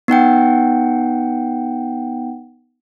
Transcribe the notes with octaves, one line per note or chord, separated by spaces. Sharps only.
B3 D#4 F#5 G5